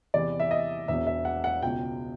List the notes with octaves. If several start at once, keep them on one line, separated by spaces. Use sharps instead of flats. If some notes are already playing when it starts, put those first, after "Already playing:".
E2 C3 E3 D5
E5
D#5
E1 E2 B2 E5
E5
F#5
F#5
C#2 B2 G5